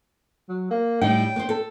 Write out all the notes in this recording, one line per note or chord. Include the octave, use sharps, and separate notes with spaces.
F#3
A#3
A2 G3 D#4 G5
B3 C5
A4